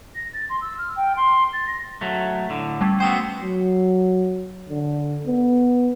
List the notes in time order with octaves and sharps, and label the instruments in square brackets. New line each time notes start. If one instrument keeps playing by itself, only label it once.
[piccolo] A#6
A6
C6
E6
F6
G5
C6
A6
A#6
[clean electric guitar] F#3 A3
A2 D3
[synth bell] G3 A3 C#4
[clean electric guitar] B3 F#4 C5 [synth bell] G5 D#6 E6
[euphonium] F#3
D3
B3